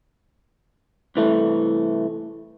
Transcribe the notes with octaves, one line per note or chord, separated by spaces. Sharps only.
C2 E3 A3